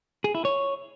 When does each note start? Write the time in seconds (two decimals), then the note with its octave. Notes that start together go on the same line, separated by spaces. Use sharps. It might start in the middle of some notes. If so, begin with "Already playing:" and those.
0.24 G#4
0.35 E4
0.45 C#5